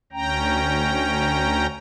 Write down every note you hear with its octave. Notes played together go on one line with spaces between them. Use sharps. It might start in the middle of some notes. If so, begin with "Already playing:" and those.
D2 C#4 G5 A#5